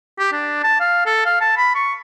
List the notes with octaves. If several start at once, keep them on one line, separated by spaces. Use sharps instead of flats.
G4
D4
A5
F5
A4
F5
A5
B5
C#6